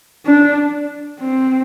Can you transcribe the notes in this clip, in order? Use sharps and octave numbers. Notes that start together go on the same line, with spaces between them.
D4
C4